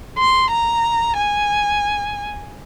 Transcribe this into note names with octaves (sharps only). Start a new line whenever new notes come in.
C6
A#5
G#5